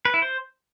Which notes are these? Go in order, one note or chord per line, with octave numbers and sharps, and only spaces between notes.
B4
E4
C5